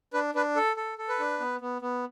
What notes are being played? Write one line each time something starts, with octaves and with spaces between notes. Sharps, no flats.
D4 B4
D4 B4
A4
A4
A4
B4
D4
B3
B3
B3